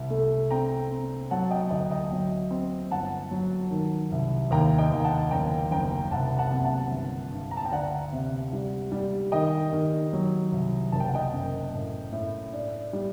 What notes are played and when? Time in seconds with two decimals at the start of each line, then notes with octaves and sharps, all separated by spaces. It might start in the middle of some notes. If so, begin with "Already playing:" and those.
Already playing: C2
0.10 A3
0.50 C4 G5 A#5
0.91 C4
1.31 F#3 F#5 A5
1.50 D#5 G5
1.70 D2 D#5 G5
1.91 D#5 G5
2.12 F#3
2.51 C4
2.91 G1 F#5 A5
3.31 F#3
3.71 D#3
4.11 C2
4.51 D#2 G5 A#5
4.78 D#5 G5
4.92 D#2
5.04 F#5 A5
5.31 F#1 G5 A#5
5.71 F#1 G5 A#5
6.11 C2 F#5 A5
6.39 F#5 A5
6.52 C3
6.65 F#5 A5
6.91 G1
7.32 G2
7.51 A#5
7.57 A5
7.66 G5
7.72 D2 D5 F#5
8.13 C3
8.53 G3
8.92 G3
9.32 D#3 D#5 G5
9.73 D#3
10.13 F#3
10.52 C2
10.92 F#1 A5
11.00 G5
11.08 F#5
11.15 D#5 G5
11.33 F#2
11.73 A2
12.12 A2
12.53 D4
12.93 G3